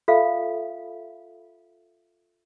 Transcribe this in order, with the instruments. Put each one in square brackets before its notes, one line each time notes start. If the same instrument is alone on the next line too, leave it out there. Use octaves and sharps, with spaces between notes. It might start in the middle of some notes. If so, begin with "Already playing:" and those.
[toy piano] F4 A4 E5 F5